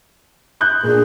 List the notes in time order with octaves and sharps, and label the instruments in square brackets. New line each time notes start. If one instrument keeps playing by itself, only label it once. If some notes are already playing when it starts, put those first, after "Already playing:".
[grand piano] D#6 F#6 G6
[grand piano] A#2 D4 [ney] G#4